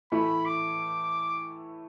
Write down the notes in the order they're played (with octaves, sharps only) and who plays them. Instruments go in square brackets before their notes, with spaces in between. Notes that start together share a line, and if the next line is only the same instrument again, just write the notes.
[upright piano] A2 E3 A3 E4 [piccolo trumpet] B5
[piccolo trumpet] D6